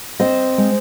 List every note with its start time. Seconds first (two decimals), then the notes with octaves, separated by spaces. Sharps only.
0.20 C4 C5 D#5
0.58 G#3